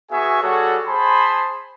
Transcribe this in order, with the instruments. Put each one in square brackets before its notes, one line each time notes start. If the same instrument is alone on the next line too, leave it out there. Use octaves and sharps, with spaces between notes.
[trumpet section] B3 F#4 G#4 E5 G#5 C#6
G3 F#4 G#4 A4 C#5 F#5
G#4 C5 G#5 A5 B5 C6